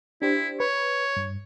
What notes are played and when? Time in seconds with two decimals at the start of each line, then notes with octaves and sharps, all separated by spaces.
0.22 D4 E4 G4 C5
0.60 B4 C#5
1.17 G2